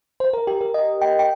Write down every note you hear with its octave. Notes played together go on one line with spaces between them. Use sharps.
C5
A#4
G4
A#4
D#5
G5
G5